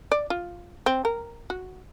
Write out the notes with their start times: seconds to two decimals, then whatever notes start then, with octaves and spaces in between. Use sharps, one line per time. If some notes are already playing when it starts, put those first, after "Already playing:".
0.12 D5
0.30 F4
0.86 C4
1.05 A#4
1.50 F#4